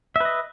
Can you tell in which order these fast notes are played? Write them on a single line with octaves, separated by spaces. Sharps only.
E5 B4 D#5